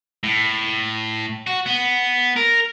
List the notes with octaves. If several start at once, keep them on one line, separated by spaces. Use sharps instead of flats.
A2
F#4
B3
A#4